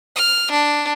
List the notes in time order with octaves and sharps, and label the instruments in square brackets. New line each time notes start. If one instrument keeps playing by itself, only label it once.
[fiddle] F6
D4